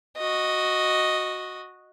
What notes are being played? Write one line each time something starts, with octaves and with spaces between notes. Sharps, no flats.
F#4 D#5